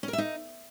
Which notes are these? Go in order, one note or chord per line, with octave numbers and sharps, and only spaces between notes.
C#4
A#4
E5
D#4